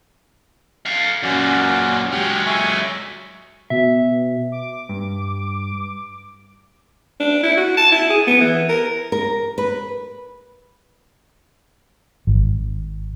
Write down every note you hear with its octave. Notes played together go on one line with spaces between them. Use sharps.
A4 F5
F#2 A#2 C#4 F#4 D5
F#3 G#3 G4 F6
E5 G#5 C#6
B2 E5
D6
G2
D4
E4
F#4
A5
E4
G#4
B3
E3
A#4
A#4
B4
G#1